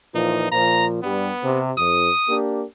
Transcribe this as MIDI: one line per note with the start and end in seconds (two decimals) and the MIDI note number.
0.15 0.51 46
0.15 0.51 52
0.15 0.51 53
0.15 0.47 63
0.52 1.00 46
0.52 1.00 53
0.52 0.86 82
1.03 1.31 43
1.03 1.31 55
1.03 1.60 59
1.43 1.70 48
1.78 2.09 41
1.78 2.36 87
2.29 2.65 58
2.29 2.65 62
2.29 2.65 67